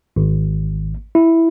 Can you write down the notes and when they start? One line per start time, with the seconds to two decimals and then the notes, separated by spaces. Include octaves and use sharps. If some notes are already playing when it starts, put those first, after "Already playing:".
0.16 G#1
1.15 E4